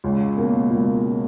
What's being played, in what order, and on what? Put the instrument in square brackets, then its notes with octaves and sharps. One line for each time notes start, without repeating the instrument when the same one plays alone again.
[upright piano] C#2
B2 A#3
C#2